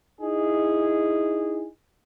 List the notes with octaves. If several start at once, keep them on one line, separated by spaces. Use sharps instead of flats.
D#4 E4 G#4